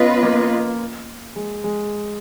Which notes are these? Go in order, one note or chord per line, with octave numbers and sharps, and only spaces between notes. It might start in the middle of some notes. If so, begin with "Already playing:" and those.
Already playing: B3 C#4 F4 B4 D#5
A#3
G#3
G#3